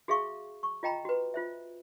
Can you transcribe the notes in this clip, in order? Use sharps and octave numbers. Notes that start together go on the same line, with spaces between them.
F#4 G#4 E5 F5 C#6
C#6
F4 D#5 G5 A#5 B5
F#4 B4
F4 C5 E5